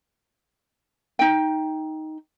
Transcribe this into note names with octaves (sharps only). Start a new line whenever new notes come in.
D#4 G5